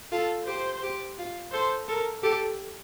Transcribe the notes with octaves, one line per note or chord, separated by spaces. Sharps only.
F4 A4
G4 C5
G4
F4
A4 C5
A4 A#4
G4 A4